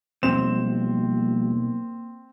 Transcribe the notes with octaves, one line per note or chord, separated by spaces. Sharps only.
B1 F3 G3 A#3 C4 E7